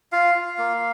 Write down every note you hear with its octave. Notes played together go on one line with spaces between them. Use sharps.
F4 F5
F4
A#3